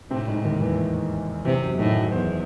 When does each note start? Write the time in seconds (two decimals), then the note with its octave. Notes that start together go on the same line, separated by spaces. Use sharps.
0.10 A2 C3 C4
0.28 G#2 G#3
0.45 D#2 D#3
0.61 E2 E3
1.45 E2 C3 E3
1.62 F#2 F#3
1.78 A2 D#3 D#4
1.96 F#3 F#4
2.12 E2 C5